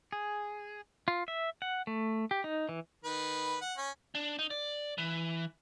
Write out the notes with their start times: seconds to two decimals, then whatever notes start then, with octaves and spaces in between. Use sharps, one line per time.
0.12 G#4
1.08 F4
1.28 E5
1.62 F#5
1.87 A3
2.31 G4
2.44 D#4
2.69 E3
3.04 D#3 B4
3.61 F#5
3.77 C#4
4.15 D4
4.39 D#4
4.51 D5
4.98 E3